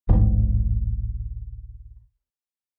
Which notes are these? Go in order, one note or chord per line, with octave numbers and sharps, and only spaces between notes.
D1 A1 G#2